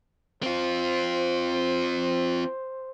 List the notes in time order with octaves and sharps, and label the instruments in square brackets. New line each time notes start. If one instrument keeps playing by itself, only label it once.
[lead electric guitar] C4 F4 [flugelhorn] C5